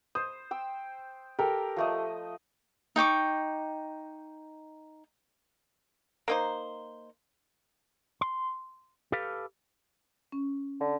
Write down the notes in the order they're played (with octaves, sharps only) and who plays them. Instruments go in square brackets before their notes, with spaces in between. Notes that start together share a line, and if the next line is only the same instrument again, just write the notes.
[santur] C5 [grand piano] D#6
[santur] G5 E6
[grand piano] G4 A4 [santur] A#4
[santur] F3 A3 D#5
[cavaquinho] D#4 G5 C#6 D6
[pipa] A#3 D#4 C5
[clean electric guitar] C6
G4 A4 B4 F5
[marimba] C#4
[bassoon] D3